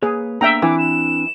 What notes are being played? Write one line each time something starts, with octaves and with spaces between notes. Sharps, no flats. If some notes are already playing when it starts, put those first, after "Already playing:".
A#3 G#4 B4 C#5
A#3 B3 D4 E5 G5 A#5 E6
E3 C4 D4 D6
E7